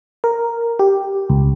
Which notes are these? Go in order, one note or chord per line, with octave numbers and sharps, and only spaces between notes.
A#4
G4
C#2